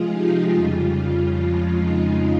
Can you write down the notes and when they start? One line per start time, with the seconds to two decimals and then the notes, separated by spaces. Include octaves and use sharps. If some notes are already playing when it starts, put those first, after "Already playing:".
Already playing: C3 F3 G#3 F4 G#4
0.10 D#4 G4
0.51 F2 C#3 G3 F4
0.93 F4
1.34 F2 C#3 F3 G#3
1.75 D#4